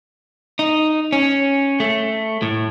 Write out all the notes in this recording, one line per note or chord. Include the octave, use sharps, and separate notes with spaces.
D#4
C#4
A3
A2